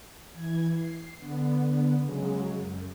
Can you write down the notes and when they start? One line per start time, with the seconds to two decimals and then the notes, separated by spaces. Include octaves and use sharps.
0.31 E3 G#6
0.73 C7
1.17 D3 B3
2.03 C#3 F#3 G#3
2.55 F#2